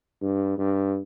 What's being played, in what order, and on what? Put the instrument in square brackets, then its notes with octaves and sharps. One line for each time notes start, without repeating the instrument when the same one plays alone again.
[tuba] G2
G2